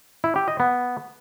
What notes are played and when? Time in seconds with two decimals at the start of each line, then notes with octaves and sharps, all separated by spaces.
0.24 E4
0.36 G4
0.48 D#5
0.60 B3